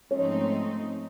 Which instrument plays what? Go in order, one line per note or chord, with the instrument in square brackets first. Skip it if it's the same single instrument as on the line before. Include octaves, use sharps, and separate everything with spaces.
[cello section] G#2 F3 A3 C4 D#4 [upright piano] C#4 C#5